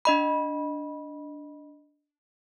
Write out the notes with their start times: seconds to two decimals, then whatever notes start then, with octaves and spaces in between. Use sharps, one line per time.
0.05 D4 D#5 B5